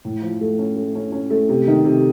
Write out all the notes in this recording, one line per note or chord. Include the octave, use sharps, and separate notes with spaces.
A2
F3
A3
C#4
A3
C#4
C#4
A3
C3
D#3
C3